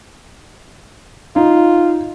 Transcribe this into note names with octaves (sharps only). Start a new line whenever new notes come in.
D#4 F4